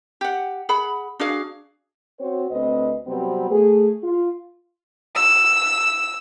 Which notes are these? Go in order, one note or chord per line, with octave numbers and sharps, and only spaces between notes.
G4 F#5
G#4 F#5 B5
D4 F#4 G#4 F5
C4 F#4 C5 C#5
D2 C4 B4 D#5
C3 F#3 G3 B3 C4
A3 G#4
F4
E6